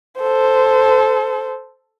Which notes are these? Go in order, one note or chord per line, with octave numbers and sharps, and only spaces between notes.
A4 C5